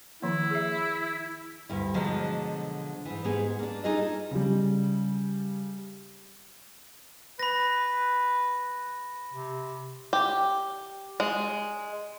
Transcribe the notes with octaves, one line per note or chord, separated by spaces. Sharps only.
D#3 F3 A#3 E4
G#4 E5
D2 G2 E4
B2 D3 F3 F#3 G#3
G#2 E3
G#2 B3 G#4
A#3 D4
D#4 F4 G#4 A4 D#5
C#3 G3
B4 B5 A#6
C3
G4
G#3